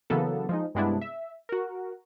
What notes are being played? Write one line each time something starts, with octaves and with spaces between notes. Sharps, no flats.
C#3 E3 F#3 A#3 B3 A4
F3 G#3 D#4
G2 C3 G#3 B3 D4 E4
E5
F#4 A#4